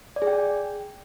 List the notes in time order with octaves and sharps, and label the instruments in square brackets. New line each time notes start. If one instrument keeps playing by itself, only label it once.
[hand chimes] D5
G#4
G5